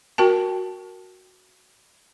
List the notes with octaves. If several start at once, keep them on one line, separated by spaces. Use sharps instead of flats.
F#4 A#4 G5 A5